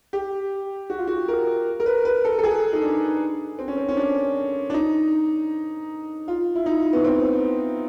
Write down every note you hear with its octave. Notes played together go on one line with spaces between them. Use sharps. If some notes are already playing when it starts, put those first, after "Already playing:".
G4
F#4
F4
F#4
A#4
A#4
B4
B4
A4
A4
G#4
D#4
D4
C4
C#4
C4
C#4
D4
D4
D#4
F4
E4
D#4
B3
C4